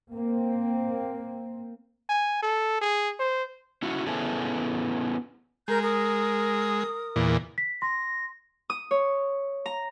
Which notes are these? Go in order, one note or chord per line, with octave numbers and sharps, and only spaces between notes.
A#3 C4
G#5
A4
G#4
C5
C#4 E4 F#4
B3 C#4 E4 G#4 A4
G#3 A#4 A#5 G6
A#4 D#6
E2 A#2
B6
C6 A#6
D#6
C#5
A#5